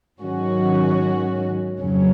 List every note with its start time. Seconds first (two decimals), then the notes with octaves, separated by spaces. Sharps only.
0.19 G#2 D#3 F#3 C#4 F#4
1.80 F2 C#3 F#3 C#4